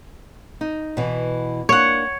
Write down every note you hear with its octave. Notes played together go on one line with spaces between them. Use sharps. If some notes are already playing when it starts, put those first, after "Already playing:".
D#4
B2 E3
A#3 D4 C#5 F#5